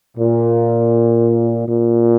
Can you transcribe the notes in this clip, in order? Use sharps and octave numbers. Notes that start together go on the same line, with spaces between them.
A#2
A#2